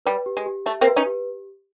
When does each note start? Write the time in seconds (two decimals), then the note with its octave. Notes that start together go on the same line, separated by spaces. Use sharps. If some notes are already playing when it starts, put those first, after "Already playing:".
0.06 G3 B4
0.26 G4
0.37 G#3
0.46 G4
0.66 A3 E5
0.81 A#3 C4
0.87 B4
0.96 C#4 D#4
1.06 G4